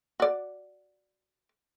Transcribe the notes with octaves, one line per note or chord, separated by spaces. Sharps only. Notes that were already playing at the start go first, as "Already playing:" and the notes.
F#4 D5